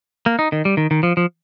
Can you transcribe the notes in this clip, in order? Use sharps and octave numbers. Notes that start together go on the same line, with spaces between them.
A#3
D#4
D#3
G3
D#3
D#3
F3
F3